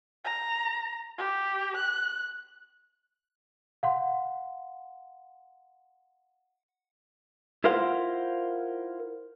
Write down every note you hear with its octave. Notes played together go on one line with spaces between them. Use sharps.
A#5
G4
F#6
F5 F#5 C6
E4 F4 A#4 C5 F5 F#5